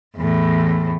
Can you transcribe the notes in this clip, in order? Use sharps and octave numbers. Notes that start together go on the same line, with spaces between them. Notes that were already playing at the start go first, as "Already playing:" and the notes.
E2 A2